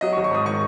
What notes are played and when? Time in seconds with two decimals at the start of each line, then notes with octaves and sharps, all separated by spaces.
0.01 F#3 D#5
0.13 C#6
0.17 G#1
0.24 C#6
0.31 G#2 D#6
0.46 D#3 C#6